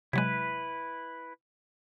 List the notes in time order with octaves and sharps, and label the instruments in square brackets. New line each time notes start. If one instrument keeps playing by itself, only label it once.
[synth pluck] C3 F#3 G#3 [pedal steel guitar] E4 B4